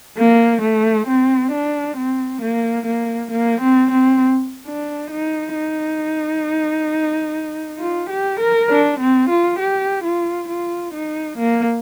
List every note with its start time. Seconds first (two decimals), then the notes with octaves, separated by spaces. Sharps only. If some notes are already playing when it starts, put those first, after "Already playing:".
0.18 A#3
0.62 A3
1.07 C4
1.52 D4
1.97 C4
2.42 A#3
2.86 A#3
3.31 A#3
3.61 C4
3.91 C4
4.66 D4
5.11 D#4
5.55 D#4
7.80 F4
8.10 G4
8.40 A#4
8.70 D4
9.00 C4
9.30 F4
9.59 G4
10.04 F4
10.49 F4
10.94 D#4
11.38 A#3